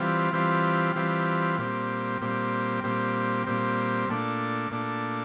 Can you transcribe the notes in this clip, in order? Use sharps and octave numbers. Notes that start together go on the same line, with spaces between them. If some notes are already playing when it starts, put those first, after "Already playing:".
Already playing: E3 G3 C4 F4
E3 G3 C4 F4
E3 G3 C4 F4
A#2 G3 C4
A#2 G3 C4
A#2 G3 C4
A#2 G3 C4
A#2 A3 D4
A#2 A3 D4